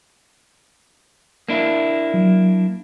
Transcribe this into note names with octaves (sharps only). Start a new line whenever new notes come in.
A#3 D4 E4
F#3